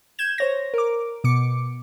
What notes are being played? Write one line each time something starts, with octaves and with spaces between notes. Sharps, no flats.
G6 G#6 E7
C5 C#5 A#6
A#4 D6
B2 D6 C#7